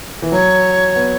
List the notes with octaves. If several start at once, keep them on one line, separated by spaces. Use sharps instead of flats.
E3
F#3 C#5
B3